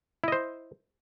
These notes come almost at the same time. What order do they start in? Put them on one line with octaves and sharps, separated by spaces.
E4 D#5 C5